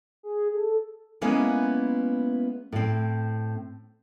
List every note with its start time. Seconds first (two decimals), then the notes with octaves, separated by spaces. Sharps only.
0.23 G#4
0.54 A4
1.21 G#3 A#3 B3 C#4 E4
2.72 A2 C4